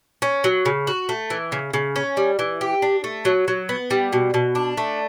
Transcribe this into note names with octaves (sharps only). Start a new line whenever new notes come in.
C#4
F#3
C#3
F#4
A3
E3
C#3
C#3
C#4
G3
E3
G4
D4
A3
F#3
F#3
B3
G3
B2
B2
D4
A3